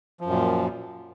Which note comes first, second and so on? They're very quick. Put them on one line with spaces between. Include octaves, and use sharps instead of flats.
F3 F#2 A#2